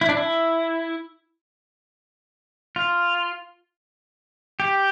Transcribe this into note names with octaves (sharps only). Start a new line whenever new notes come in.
E4
D4
E4
F4
G4